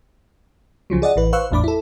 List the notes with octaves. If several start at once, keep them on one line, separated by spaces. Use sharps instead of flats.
C#2 C#3 F3 F#3
G#4 D5 D#5 F#5
A1 E3 B4
B4 C5 F5 C#6 E6 F#6
G#1 E2 A2 D4 B5 D6
E4 A4